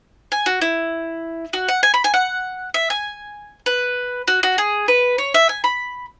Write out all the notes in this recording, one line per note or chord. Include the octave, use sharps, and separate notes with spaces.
G#5
F#4
E4
F#4
F#5
G#5
B5
G#5
F#5
E5
G#5
B4
F#4
F#4
G#4
B4
C#5
E5
G#5
B5